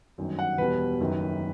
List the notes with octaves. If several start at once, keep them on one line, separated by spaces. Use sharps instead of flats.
G1 F#2 D#3
F#5
E1 E2 B2 G3 B4
F#1 F#2 D#3